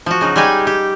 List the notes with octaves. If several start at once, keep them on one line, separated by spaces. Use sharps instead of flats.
F3 F#4
C#3 D#4
G3 G#3 D#4 G4 G#5
G4